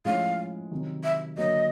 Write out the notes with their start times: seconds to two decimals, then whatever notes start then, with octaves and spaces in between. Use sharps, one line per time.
0.05 A2 F3 G#3 C#4 F5
0.71 C3 D#3 F#3
1.04 E5
1.37 D3 F#3 A#3 D#5